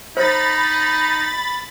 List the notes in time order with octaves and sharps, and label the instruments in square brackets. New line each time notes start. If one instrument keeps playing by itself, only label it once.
[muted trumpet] D#4 [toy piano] C5 [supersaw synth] B5 A6